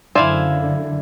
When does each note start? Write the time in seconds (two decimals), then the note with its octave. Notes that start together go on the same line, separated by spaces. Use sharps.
0.15 F#2 D3 E4 C5 D5 E5 F5 G#5